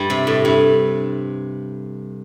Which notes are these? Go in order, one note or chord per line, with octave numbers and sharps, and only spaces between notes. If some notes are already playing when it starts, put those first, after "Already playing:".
Already playing: G2 G3
C3
A2
G2